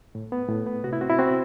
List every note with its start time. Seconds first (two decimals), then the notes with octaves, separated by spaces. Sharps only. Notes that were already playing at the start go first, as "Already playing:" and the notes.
0.15 A2
0.32 B3
0.49 A2
0.67 B3
0.84 C3 F#4
0.93 E4
1.01 C4 F#4
1.10 E4
1.19 C4 F#4